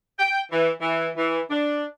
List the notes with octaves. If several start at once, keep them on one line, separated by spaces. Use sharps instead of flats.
G5
E3
E3
E3
D4